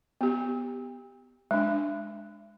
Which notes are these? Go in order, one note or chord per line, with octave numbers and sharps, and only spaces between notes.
B3 G4
G#3 D4